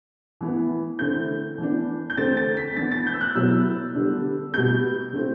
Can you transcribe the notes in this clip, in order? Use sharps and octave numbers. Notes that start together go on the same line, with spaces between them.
E3 B3 E4
D3 A3 C4 E4 G6
E3 B3 D4
G6
D3 A3 C4 A6
A6
B6
E3 B3 D4 A6
A6
G6
E6
F#6
B2 F#3 B3 E4 E6
D3 G3 B3 D4
B2 G3 B3 G6
D3 A3 C4 E4